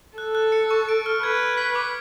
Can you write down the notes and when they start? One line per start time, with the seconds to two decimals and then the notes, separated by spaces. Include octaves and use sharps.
0.17 A4 F#6
0.35 F#6
0.52 C#7
0.71 C#6
0.89 D7
1.06 F6
1.23 B4 G#6
1.40 G#6
1.58 B6
1.75 D6